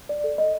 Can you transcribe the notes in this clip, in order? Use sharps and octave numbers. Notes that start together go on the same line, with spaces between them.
D5
A4
D#5